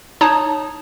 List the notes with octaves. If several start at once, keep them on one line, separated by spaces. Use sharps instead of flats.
D#4 C#5 A5 A#5 D#6